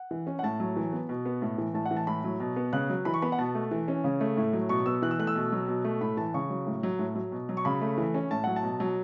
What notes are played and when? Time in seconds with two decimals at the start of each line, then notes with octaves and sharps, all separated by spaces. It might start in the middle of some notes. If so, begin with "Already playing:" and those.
Already playing: F#5
0.11 E3
0.27 C#4
0.39 F#5
0.43 A2 A5
0.60 F#3
0.76 E3
0.93 B3
1.09 B2
1.26 B3
1.42 A2
1.58 E3
1.74 A2 A5
1.86 F#5
1.91 E3
1.97 A5
2.07 A2 B5
2.24 F#3
2.40 B2
2.56 B3
2.73 C#3 F#6
2.90 F#3
3.05 E3 B5
3.14 C#6
3.22 B3 B5
3.32 F#5
3.38 B2 A5
3.55 A3
3.71 E3
3.88 C#4
4.04 C#3
4.21 A3
4.37 A2
4.53 F#3
4.69 B2 C#6
4.86 B3 E6
5.02 E3 F#6
5.11 E6
5.19 A3 F#6
5.27 E6
5.35 B2
5.52 F#3
5.68 B2
5.84 A3
6.01 A2 B5
6.17 E3 A5
6.34 C#3 C#6
6.50 F#3
6.67 A2
6.83 F#3
6.99 A2
7.15 F#3
7.32 B2
7.49 F#3
7.57 C#6
7.65 C#3 B5
7.81 A3
7.98 E3
8.14 C#4
8.31 A2 A5
8.44 F#3 F#5
8.56 A5
8.63 B2
8.80 F#3